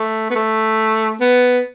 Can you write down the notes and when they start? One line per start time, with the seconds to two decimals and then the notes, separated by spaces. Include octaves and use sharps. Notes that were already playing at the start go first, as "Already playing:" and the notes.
Already playing: A3
0.30 B3
0.35 A3
1.21 B3